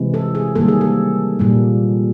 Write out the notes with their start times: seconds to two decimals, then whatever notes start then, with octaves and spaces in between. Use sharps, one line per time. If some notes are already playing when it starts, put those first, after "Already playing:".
Already playing: C3 E3 G#3
0.14 A4
0.35 G#4
0.55 D#3 G3 A#3 A4
0.68 G#4
0.81 A4
1.39 A#2 G3 A#3